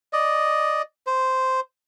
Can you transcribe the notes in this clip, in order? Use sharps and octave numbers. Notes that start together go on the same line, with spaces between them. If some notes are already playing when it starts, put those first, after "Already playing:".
D5 D#5
C5